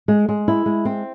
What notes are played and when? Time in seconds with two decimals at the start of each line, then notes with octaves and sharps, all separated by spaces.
0.08 G#3
0.29 G#3
0.48 E4
0.66 G#3
0.85 C4